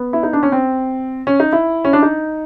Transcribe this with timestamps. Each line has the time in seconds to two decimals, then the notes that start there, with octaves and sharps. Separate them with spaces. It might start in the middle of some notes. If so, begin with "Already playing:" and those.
Already playing: B3
0.13 E4
0.23 D#4
0.33 D4
0.43 C#4
0.52 C4
1.27 C#4
1.40 D#4
1.53 E4
1.85 C#4
1.93 D4
2.03 D#4